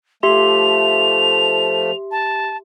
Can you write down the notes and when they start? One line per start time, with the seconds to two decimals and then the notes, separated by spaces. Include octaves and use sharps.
0.23 F3 A3 G4 E5 C6 F7
2.11 A5